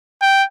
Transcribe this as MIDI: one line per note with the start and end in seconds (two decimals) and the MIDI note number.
0.22 0.44 79